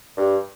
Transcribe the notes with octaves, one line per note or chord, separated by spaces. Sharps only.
G2